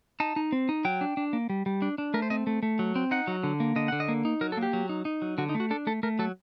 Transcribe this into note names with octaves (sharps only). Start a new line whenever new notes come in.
D#4 A5
D#4
C4
D#4
F#3 G5
D4
D4
A#3
G3
G3
D4
D4
A3 A#4
C5
C4 D#5
A3
A3
F#3
C4
D#4 F#5
F#3
D3
A#3
D3 D#5
D3 F#5
D#5
A#3
D#4
F#3 A#4
A4
A#3
G4
F#3
D#4
D#4
F#3
D3 F#4
D#4
A3
F#4
D4 A4
A3 A4
A3 A#4
F#3 A4